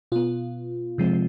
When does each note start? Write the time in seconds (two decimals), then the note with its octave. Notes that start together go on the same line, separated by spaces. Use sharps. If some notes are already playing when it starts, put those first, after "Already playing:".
0.12 B2 B3 F4
0.98 C3 F3 G#3 C4